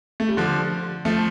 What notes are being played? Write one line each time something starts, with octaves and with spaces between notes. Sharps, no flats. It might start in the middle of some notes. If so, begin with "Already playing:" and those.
A3
G3
D3 F3
F3 A3